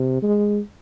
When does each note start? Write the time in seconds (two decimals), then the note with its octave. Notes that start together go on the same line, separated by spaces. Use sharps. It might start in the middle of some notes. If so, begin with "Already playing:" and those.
Already playing: C3
0.23 G#3